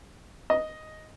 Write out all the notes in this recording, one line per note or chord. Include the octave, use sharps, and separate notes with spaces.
D#5